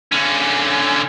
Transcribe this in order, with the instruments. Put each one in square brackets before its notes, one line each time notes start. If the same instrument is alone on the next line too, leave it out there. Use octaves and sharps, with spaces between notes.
[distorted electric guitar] D3 C#4